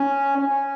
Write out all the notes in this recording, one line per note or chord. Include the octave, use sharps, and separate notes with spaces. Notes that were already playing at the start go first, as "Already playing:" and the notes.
Already playing: C#4
C#4